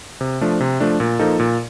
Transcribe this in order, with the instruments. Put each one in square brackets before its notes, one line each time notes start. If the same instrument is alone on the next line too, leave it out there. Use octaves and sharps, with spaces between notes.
[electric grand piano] C3
F3 A3 D4
C3
F3 A3 D4
A#2
F3 A#3 D#4 A4
A#2